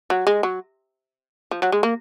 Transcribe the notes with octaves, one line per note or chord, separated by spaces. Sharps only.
F#3
G#3
F#3
F3
F#3
G#3
A#3